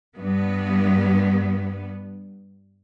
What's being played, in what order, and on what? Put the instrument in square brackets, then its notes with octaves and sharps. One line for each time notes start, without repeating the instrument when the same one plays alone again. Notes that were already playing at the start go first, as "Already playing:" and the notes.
[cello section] G2 B3